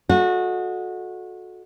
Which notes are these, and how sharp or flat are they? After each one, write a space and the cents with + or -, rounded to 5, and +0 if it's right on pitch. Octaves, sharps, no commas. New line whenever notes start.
F#4 -25 A4 -25 D#5 +0